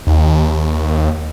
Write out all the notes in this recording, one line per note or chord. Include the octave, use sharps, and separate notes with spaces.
D#2